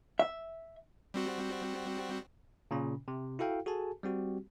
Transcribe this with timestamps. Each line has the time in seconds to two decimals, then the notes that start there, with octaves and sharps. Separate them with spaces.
0.19 E5
1.14 G3 C4 F#4
2.71 A#2 C#3 C#4
3.08 C3
3.39 E4 F#4 A4 F5 G5
3.66 F#4 G#4 A4 G#5 A5
4.03 G3 C4 F#4 G4